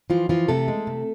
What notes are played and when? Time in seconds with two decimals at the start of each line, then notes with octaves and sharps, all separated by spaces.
0.10 E3 F3 F4
0.29 E3 F3 F4
0.48 C3 A3 A4
0.68 G#3
0.87 C3